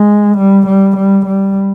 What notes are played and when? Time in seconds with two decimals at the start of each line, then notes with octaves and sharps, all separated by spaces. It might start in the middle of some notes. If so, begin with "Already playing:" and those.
Already playing: G#3
0.38 G3
0.67 G3
0.97 G3
1.26 G3